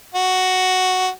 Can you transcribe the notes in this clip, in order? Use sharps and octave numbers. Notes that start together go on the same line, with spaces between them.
F#4